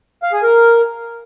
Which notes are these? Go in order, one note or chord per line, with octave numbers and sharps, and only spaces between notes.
F5
G#4
A#4